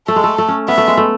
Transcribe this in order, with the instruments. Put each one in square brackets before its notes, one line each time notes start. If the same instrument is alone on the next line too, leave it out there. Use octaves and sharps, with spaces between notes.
[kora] A3 [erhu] A4
[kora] G#3
A3
A3
C#4
[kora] B3 [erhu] E5
[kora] A3
G#3
A3